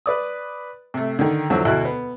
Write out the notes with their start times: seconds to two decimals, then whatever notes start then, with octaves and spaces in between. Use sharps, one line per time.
0.06 B4 D5 D#6
0.94 C3 A3
1.19 D3 D#3
1.50 E2 D3 F3 F#3
1.65 D2 B2 E4 F#4 F#6
1.85 B3